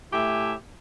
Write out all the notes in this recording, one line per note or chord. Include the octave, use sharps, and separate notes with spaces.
A2 A3 G4 E5 G#5